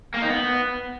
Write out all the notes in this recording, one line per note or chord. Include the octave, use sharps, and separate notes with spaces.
A#3
D#4
B3